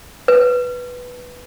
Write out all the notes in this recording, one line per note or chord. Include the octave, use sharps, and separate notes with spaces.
B4